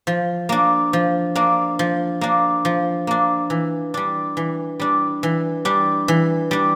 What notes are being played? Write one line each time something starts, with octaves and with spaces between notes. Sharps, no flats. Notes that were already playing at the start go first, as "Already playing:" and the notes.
F3
A#3 D4
F3
A#3 D4
F3
A#3 D4
F3
A#3 D4
E3
G3 D4
E3
G3 D4
E3
G3 D4
E3
G3 D4